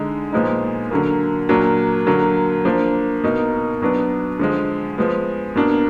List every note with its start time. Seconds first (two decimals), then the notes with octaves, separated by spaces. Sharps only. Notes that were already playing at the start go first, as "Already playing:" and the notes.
Already playing: D3 G#3 D#4
0.32 A#2 F3 G#3 B3 D#4
0.91 D3 F#3 A#3
1.49 A#2 F#3 A#3 D4
2.07 D3 F#3 A#3
2.65 F3 A#3 D4
3.23 B2 A#3 D#4
3.81 B2 F#3 B3 D4
4.39 D3 F3 G#3
4.98 F3 G#3 B3
5.55 B2 A#3 D4